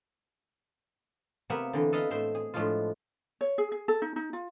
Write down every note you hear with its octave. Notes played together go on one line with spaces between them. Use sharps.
C3 A#3 B3 E5 F#5
D3 E3
A4 B4 D#5 F5
A2 C5 E5 C6
G#4
A2 F3 G#3 D4 F4
C#5
G#4
G#4
A4
D#4
D#4
F4